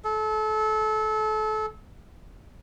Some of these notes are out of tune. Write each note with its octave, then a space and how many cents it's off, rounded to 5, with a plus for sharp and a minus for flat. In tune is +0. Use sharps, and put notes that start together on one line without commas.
A4 -30